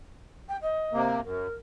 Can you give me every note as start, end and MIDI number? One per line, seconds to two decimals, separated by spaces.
0.49 0.57 79
0.62 1.04 75
0.93 1.21 48
0.93 1.21 58
1.24 1.47 42
1.24 1.53 70